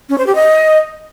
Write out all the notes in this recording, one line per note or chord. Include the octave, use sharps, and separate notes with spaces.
C#4
C5
G4
D#5